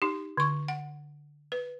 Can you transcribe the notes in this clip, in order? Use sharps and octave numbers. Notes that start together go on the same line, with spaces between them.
D#4 G4
D3 C#6
F#5
B4